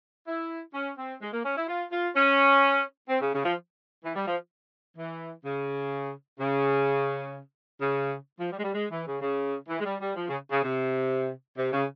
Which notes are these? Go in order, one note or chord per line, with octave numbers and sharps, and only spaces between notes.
E4
C#4
C4
G#3
A#3
C#4
E4
F4
F4
C#4
C4
C#3
C#3
F3
E3
G3
F3
E3
C#3
C#3
C#3
F3
G3
G#3
G3
G#3
E3
C#3
C#3
E3
G#3
G3
G3
F3
C#3
C#3
C3
C3
C#3